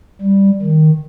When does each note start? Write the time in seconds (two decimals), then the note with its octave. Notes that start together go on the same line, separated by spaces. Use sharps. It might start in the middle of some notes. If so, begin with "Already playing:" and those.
0.21 G3
0.62 D#3